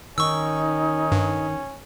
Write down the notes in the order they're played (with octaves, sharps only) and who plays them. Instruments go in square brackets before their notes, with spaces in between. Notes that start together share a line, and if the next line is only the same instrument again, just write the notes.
[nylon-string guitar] D#3 [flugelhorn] C#4 [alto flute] D#4 [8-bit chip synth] C#6 E6
[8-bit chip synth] G2